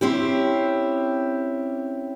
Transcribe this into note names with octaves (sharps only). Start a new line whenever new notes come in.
C4 C#4 E4 G4